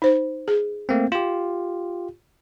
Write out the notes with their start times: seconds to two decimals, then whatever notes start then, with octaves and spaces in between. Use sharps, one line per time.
0.02 D#4 C5
0.48 G#4
0.89 A3 A#3 C4
1.12 F4 G4